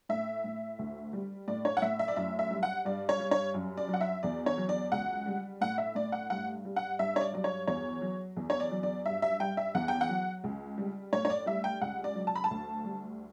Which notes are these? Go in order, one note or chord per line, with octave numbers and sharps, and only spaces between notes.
A2 E5
A2
D2
G3
A2 D5
C#5
F#5
A2 E5
E5
D5
F#2 E5
E5
G3
F#5
G2 D5
C#5
G3
C#5
F#2
D5
F#3
F#5
E5
E2 D5
C#5
F#3
D5
C#2 F#5
G3
A2 F#5
E5
A2 D5
F#5
G2 F#5
G3
F#5
G2 E5
C#5
D5
F#3 D5
C#5
E2 C#5
F#3
E2
C#5
D5
F#3
D5
G2 E5
E5
G3 G5
E5
E2 F#5
G5
F#5
F#3
C#2
G3
A2 C#5
C#5
D5
G3 E5
G5
C#2 F#5
D5
F#3
A5
B5
A5
D2
G3